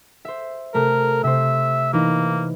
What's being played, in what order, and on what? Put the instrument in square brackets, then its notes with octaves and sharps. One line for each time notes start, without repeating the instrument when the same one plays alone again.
[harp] C5 E5
[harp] C3 A3 [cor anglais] A#4
[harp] C3 C5 [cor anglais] E5
[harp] E3 D#4 [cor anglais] A#3